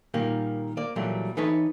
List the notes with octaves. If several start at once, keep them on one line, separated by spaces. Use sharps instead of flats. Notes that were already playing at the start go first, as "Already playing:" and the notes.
A#2 D#3 G3 A#3
A#3 D5
A#2 E3 F#3 G3 A3 A#3
E3 D#4 A4 B4 C#5